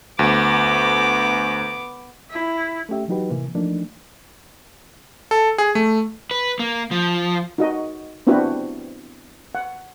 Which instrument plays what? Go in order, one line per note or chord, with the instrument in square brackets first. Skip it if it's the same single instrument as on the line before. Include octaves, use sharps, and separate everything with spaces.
[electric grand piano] D2 [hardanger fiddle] B3 D6
[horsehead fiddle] E4
[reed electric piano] A3 C#4 G4 E5
E3 F#3 D#4 F#4 G4 B4
A2 C3 E3 A#3
E3 F3 A3 A#3 D4 D#4
[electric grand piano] A4
G#4
A3
[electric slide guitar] B4
A#3
F3
[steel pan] D#4 F#4 D#5
B3 C4 D4 E4 F#4 B4
F#5